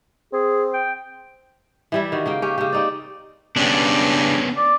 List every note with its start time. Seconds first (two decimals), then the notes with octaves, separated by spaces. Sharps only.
0.33 C4 G#4
0.73 G5
1.92 E3 G3 E4
2.12 D#3 F#4
2.26 C#3 A#3 G5
2.42 C#4 G4
2.58 C#3 G4
2.73 C4 D#4 D5
3.56 G2 C#3 B3 C#4 D4
4.57 D5